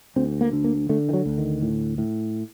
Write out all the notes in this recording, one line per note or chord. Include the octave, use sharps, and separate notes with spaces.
D2 C4
A#3
D3
A#3
D3 A3
D#3
F#3
D2
D#3
A2
A2